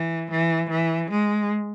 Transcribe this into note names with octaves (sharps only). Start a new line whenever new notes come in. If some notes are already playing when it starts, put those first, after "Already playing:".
Already playing: E3
E3
E3
G#3